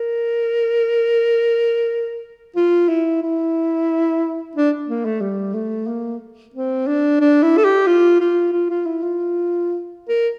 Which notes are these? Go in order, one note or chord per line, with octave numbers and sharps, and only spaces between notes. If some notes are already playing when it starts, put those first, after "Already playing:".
Already playing: A#4
F4
E4
E4
D4
A#3
A3
G3
A3
A#3
C4
D4
D4
E4
A4
G4
F4
F4
F4
F4
E4
F4
A#4